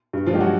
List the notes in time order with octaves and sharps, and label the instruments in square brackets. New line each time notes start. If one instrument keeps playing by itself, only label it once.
[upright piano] G2
F3 F4
G#3 G4
F#3 F#4